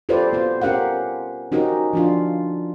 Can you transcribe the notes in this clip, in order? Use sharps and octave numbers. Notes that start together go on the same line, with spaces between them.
F4 G4 A4 B4 C5 D5
B3 F4 C5
C#4 G4 A#4 F5 F#5
C#4 D#4 F#4 G4 A#4
F3 D4 F4